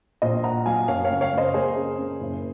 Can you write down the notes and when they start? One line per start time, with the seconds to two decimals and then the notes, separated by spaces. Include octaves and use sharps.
0.22 A#1 C5 D#5
0.44 A#2 F#5 A#5
0.66 F#3 F5 G#5
0.88 F#2 C#5 F5
1.05 C#5 F5
1.10 C#3
1.21 C#5 F5
1.33 C#3 C5 D#5
1.54 A#3 G#4 C5
1.77 C#4
1.98 C#4
2.21 F#1